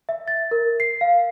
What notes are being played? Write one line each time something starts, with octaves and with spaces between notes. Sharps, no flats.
E5
A6
A#4
C7
F5